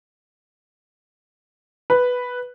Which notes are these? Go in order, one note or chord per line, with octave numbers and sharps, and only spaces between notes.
B4